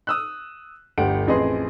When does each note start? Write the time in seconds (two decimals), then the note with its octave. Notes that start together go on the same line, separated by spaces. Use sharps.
0.07 D#6 E6 F#6
0.98 G1 D2 G4 F#5 D7
1.27 A1 F2 G#4 B4 D#5 C6